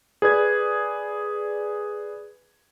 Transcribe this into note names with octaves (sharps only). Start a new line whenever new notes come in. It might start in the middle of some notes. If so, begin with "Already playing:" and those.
G#4 B4 D5 G#6